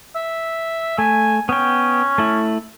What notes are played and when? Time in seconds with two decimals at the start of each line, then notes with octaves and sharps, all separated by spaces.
0.16 E5
0.98 A3 G#5
1.49 B3 C#4 G5
2.18 A3 E4